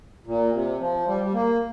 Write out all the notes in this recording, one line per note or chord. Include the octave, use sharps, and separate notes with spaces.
A#2
C3
F3
G3
G3
A#3